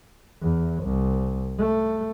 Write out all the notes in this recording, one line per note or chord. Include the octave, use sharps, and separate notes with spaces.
E2
C2
A3